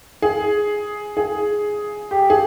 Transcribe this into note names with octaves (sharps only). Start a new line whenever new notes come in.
G#4
G#4
G4
G#4